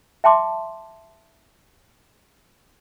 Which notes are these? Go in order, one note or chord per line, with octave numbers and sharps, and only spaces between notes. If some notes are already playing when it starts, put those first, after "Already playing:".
E5 G5 A5 C6 D6